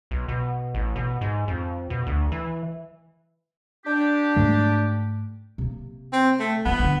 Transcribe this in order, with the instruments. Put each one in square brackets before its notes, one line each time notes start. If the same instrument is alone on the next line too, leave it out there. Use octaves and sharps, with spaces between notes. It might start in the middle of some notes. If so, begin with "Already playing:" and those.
[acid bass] B1
B2
A1
B2
G#2
F2
B2
D2
E3
[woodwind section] D4 G4
[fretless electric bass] G#2 G#3 A3
[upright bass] C3 A#3
[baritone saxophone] C4
A3
[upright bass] F3 G3 [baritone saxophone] B3
[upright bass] D3